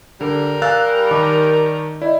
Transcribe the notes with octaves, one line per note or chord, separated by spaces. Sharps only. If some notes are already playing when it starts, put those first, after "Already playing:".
D3 G3 A#4
F5 G#5 E6 F#6 A6
D#3 A5 D6
E4 D5 D#5